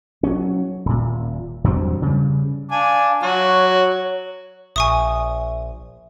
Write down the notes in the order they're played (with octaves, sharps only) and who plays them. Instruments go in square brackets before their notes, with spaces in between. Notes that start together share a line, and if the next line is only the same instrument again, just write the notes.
[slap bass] F#3 G#3 C#4
D#1 A#2
E2 G2 F#3 C4
C#3 G3
[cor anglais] D4 [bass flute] F5 [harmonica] G#5
[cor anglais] F#3 [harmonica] F#4 [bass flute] C#5
[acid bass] A#1 [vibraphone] E5 [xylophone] G#5 C#6 D#6